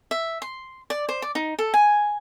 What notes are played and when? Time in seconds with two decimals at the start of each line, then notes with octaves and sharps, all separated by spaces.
0.11 E5
0.42 C6
0.90 D5
1.09 C5
1.22 D5
1.35 D#4
1.59 A4
1.74 G#5